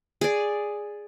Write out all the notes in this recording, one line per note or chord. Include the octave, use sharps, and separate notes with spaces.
G#4 D5